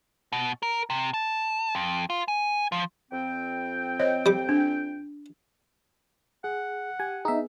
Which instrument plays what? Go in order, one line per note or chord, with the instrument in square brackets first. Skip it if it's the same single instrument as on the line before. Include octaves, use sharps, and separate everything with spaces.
[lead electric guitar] B2
A#4
C3
A5
F2
F4
G#5
F3
[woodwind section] F2 C4 G5
[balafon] C5 C#5 D#5
[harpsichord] G3 D6
[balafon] D4
[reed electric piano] G#4 [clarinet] F#5
[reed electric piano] G4 [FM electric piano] G#5
[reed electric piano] B3 G#4 [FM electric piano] D#4 E5